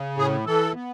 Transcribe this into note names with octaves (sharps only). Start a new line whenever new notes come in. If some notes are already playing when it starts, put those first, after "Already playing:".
Already playing: C#3
A2 G#4
E3 A4
B3